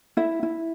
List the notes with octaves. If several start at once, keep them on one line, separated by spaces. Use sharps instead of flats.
E4 E5
E4